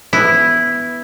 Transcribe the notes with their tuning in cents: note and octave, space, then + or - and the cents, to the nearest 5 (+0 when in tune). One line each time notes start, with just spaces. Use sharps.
B3 +0 E4 +0